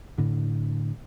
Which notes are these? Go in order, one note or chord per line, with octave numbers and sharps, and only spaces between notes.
A2 D3